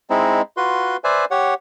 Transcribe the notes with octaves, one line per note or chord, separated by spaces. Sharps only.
G#3 C4 D#4 E4
F4 F#4 B4 C6
B4 C5 D5 E5 G#5
G4 C#5 F#5